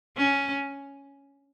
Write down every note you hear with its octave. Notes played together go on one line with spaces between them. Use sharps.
C#4